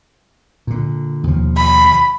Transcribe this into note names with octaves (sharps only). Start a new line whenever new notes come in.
A#2 D3
D#2 B2 F3
B5